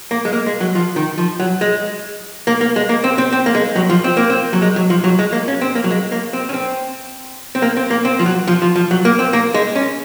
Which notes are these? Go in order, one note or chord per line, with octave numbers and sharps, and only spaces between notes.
A#3
G#3
A#3
G#3
F#3
F3
D#3
F3
F#3
G#3
A#3
A#3
G#3
A#3
C4
C4
C4
A#3
G#3
F#3
F3
C4
A#3
C4
F#3
G#3
F#3
F3
F#3
G#3
A#3
C#4
C4
A#3
F#3
G#3
A#3
C4
C#4
C4
C4
A#3
C4
A#3
C4
F3
F#3
F3
F3
F3
F#3
A#3
C4
A#3
G#3
C#4